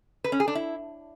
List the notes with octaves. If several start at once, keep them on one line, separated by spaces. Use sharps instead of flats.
B4
C#4
G#4
D4
E4